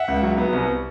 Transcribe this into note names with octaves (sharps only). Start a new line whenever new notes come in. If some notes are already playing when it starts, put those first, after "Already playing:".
Already playing: E5 F#5
C#2
F#3
B3
C2